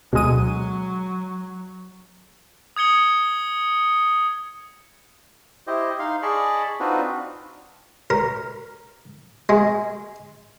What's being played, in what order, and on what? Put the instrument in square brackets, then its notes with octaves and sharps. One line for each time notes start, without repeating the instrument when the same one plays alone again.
[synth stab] D2 G#3 D#7 [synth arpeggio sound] B2 D#6 [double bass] F#3
[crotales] D#6 G#6 C#7 G7
[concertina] E4 G4 C5 D#5
D#4 F5 C6
G#4 D5 D#5 A5 B5 C#6
C4 D4 D#4 F4 F#4 B4
[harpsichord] A#4
G#3